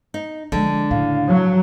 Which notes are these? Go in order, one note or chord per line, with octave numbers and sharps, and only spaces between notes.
D#4
D3 F3 G#3
A2 C#3 F5
F#3